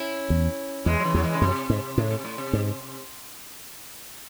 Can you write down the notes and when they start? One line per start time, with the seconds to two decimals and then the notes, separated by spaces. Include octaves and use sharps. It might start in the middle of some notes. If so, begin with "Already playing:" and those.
Already playing: C#4 E4
0.30 E2
0.85 E2 E3 G#3
1.00 F#3
1.04 C#3 E3
1.14 E2 F#3
1.23 E3 G#3
1.34 C#3
1.42 F#2 C3
1.70 G#2
1.98 A2 C#3
2.11 C3
2.25 A2
2.38 C3
2.53 G#2